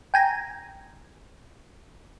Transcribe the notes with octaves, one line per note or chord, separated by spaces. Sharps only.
G5 G#5 A#5